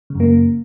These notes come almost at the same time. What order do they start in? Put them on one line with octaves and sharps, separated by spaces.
C#3 F#2 A#3